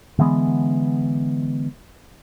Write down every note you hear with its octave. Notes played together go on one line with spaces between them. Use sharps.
D3 E3 G#3 B3